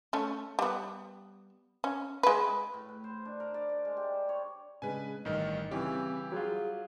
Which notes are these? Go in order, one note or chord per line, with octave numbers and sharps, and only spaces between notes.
A3 C#4
G3 B3
C#4
G#3 B4
A2
B4
C5
D4
A#4
D5
D5
G#3
G4
C5
C#5
C#3 G#3 D4 B4 G#5
A1 G2 D#3 D#5 F6
C#3 E3 G3 C4 E4 G4
F#3 F4 G#4